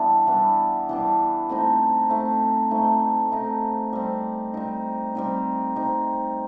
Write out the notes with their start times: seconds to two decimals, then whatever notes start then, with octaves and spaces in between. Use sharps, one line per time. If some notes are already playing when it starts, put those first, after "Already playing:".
Already playing: E3 G3 B3 D4
0.27 E3 G3 B3 D4
0.89 E3 G3 B3 D4
1.49 A3 C4 D#4
2.10 A3 C4 D#4
2.71 A3 C4 D#4
3.32 A3 C4 D#4
3.93 G3 C4 D#4
4.54 G3 C4 D#4
5.15 G3 C4 D#4
5.76 G3 C4 D#4